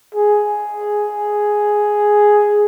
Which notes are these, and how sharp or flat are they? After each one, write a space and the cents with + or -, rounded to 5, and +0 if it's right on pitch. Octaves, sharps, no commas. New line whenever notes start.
G#4 +5